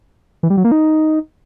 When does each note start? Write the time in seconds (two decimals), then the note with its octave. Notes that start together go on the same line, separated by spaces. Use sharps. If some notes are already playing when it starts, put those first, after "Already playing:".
0.43 E3
0.50 G3
0.57 F#3
0.64 A#3
0.72 D#4